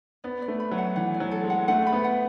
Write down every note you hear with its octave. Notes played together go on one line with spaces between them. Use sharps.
B3 D5
D5
A3
B5
F#3
F#5
E3 F#5
D5
F#3
A4
G#3
F#5
A3 F#5
B5
B3
F#5